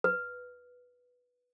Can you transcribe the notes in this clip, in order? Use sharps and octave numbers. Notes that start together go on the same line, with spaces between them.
B4